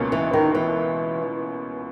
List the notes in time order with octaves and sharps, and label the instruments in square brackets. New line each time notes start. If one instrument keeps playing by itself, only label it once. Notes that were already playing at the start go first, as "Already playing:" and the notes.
Already playing: [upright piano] C#2 B2 A#3 C#4
[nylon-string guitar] E3
D#3
E3